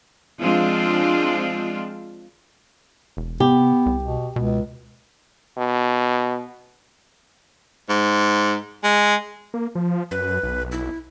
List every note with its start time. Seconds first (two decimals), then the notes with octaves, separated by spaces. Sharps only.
0.39 F3 G#3 C4 D4 F4
3.17 E1
3.40 C3 B3 G4
3.86 C2
4.03 B2
4.36 C#2 B2
5.57 B2
7.89 G#2
8.84 G#3
9.54 A#3
9.75 F3
10.11 F#2 B4
10.43 B1
10.72 E4